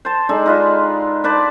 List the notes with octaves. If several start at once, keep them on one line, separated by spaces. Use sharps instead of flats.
C5 A5
G#3 D4 D#4 A4
D#4 F4 B4
D4 B4 C5 D5